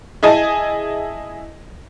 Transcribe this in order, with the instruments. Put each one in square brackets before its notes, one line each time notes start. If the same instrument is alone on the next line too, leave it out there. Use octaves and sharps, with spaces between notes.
[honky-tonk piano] E4 G#4 D#5 G#5 A5